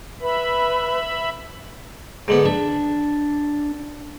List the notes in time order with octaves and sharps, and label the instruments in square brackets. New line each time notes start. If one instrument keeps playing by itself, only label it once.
[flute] B4 [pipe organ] E5 B5
[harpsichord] G#2 D3 B3
[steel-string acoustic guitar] D4 [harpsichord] E5